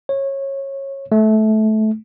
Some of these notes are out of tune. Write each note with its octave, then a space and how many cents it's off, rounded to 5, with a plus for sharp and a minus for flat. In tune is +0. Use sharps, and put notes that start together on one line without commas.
C#5 -20
A3 -20